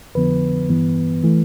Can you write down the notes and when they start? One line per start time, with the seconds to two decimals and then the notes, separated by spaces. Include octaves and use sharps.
0.15 F2 D3 F3 B3 B4
0.70 G2 E3 B3
1.24 E3 A3